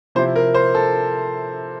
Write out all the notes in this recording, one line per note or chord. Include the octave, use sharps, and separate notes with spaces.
C3 F3 C4 E4 C5
A#4
C5
A4